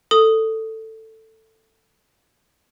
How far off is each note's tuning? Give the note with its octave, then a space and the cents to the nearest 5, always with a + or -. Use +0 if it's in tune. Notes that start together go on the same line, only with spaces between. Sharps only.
A4 +10 D#6 +0